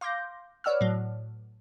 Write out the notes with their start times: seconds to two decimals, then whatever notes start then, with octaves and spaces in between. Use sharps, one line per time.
0.01 F5 C6 D6 G6 A#6
0.64 B4 C#5 D5 F#5 E6 F6
0.81 A2 F#3